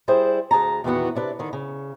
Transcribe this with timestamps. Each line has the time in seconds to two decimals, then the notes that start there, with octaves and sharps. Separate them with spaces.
0.08 G3 E4 G#4 C5
0.51 D2 G#4 A5 A#5
0.84 E2 A#2 D#3 E3 B3 F#4
1.15 C3 D4 B4
1.39 D3 D#3
1.53 C#3